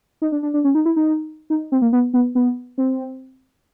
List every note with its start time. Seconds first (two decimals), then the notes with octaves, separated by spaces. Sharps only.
0.22 D#4
0.32 D4
0.43 D4
0.54 D4
0.64 C#4
0.75 D#4
0.86 E4
0.96 D#4
1.50 D#4
1.72 C4
1.82 A#3
1.93 B3
2.14 B3
2.35 B3
2.78 C4